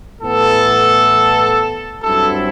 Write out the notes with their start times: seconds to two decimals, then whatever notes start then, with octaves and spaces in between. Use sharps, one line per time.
0.22 A2 E3 B3 A4
2.02 G2 F#3 C4 E4 A4